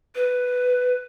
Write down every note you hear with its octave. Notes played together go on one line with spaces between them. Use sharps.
B4